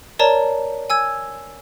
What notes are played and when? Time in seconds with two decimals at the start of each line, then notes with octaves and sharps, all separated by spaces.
0.19 A#4 C#5 D5 A5 A#5
0.90 G#5 E6 G#6